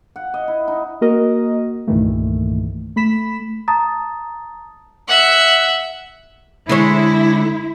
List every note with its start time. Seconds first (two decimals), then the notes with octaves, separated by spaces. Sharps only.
0.16 F#5
0.34 D#5
0.48 E4
0.68 D#4
1.01 A#3 F#4 A#4 D#5
1.88 C2 G2 A#2 D#3 E3 A3
2.96 A3 B5 B6 E7
3.68 A5 A#5 D#6 A6
5.08 E5 F#5
6.69 D3 G#3 E4 C#5